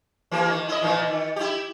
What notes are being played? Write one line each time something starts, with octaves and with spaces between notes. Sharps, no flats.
E3 A#3 G4
D#3
E4 D#5
A#2 D#3 E3
D#3
E4 G4